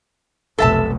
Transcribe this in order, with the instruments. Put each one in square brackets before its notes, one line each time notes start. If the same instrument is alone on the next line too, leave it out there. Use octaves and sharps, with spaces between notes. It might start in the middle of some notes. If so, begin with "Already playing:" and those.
[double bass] F1 B1 [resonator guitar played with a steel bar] A4 E5 A5